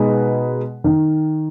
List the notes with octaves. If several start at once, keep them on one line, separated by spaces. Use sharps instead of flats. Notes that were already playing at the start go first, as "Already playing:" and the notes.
Already playing: B2 G#3 D#4 G#4 B4
D#3